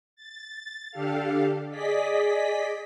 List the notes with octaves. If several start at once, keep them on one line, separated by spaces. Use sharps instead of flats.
A6
D3 D4 G4 A4 F5
G#4 D5 D#5 B6